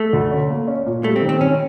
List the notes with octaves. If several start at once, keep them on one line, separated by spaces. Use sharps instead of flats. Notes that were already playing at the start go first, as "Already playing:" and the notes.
Already playing: A3
D2
C#4
A#3
C#4
A#2
G3 A3
C4
D#3
C4
D#3 C#4